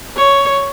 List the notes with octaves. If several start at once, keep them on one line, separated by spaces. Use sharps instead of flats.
C#5